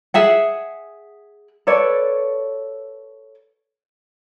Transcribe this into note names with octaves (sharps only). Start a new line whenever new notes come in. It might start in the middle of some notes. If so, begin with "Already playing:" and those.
G#4 E5 F#5
A4 B4 C#5 D5